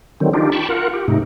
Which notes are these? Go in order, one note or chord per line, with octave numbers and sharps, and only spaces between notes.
D3 D#3 F#3 C4
D4 D#4 F4 G4
G5 A5 B5 C#6
F4 A#4 F#5
G4
G#2 C3 A3 D#4